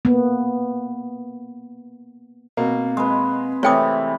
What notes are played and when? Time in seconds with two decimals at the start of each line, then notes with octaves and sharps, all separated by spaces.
0.05 A#3 B3
2.57 B2 A#3 C4
2.97 G#3 B4
3.63 C3 E3 A3 C#5 G5 D#6